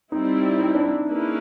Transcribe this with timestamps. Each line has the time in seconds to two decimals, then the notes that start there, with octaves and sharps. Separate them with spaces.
0.12 G3 C4 D#4 E4
0.60 D#4
0.75 D4
0.84 D#4
1.08 A#3 C#4 E4 G#4 B4